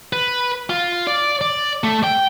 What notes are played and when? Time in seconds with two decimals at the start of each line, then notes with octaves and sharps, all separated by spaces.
0.13 B4
0.70 F4
1.07 D5
1.41 D5
1.84 A3
2.04 G5